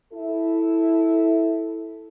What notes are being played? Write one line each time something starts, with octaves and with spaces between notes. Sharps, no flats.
E4 A4